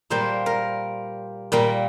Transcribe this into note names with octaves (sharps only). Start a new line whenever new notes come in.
A#2 G3 A#3 C5
A#4
A#2 G3 A#3